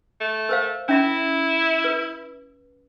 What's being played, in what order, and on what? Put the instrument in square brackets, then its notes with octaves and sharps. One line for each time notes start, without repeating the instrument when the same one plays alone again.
[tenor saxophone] A3
[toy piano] A#4 C5 F5
[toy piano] C#4 E5 B5 [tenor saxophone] E4
[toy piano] B4